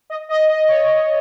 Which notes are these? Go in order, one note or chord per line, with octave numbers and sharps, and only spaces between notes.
D#5
D#5
D#5
C#5